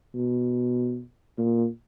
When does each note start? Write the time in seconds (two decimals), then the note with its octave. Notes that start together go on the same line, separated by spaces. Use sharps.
0.14 B2
1.38 A#2